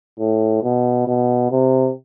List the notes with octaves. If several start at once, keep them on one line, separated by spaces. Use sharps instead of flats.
A2
B2
B2
C3